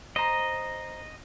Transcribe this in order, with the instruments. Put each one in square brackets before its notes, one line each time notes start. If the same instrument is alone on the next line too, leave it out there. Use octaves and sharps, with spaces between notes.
[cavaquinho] C5 A#5 [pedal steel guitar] D#5